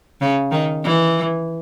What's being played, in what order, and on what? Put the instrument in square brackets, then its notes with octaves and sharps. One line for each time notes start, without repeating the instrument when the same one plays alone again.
[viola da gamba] C#3
D#3
E3